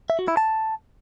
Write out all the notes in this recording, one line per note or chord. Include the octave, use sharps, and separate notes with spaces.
E5
F#4
E4
A5